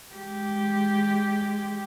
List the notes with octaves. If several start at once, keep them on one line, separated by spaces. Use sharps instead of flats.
G#3 G4